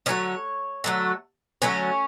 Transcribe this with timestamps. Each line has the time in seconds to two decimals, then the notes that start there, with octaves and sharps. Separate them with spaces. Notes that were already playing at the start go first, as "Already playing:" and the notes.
0.06 D3 F#3 A3 C#4 C#5
0.84 D3 F#3 A3
1.62 D3 F#3 A3 C#4 C#5